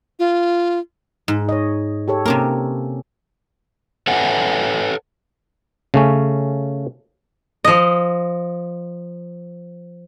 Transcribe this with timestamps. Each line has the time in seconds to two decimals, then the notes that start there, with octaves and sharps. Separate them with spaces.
0.19 F4
1.28 G#2
1.49 C#5 D#5
2.08 G4 A4 C#5
2.26 C3 A#3 C#4 G4 A#4
4.07 A4 B4 C#5 E5 F#5 G#5
5.94 C#3 A3 C#4
7.65 F3 D#5